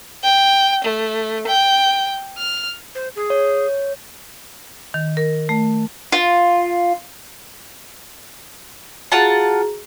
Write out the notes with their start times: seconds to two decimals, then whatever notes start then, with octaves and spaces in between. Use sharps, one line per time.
0.23 G5
0.84 A3
1.47 G5
2.37 F6
2.95 C5
3.16 G#4
3.30 C#5
4.94 D#3
5.17 A#4
5.49 A3
6.12 F4
9.12 F4 F#4 G#4 F#5 A5 A#5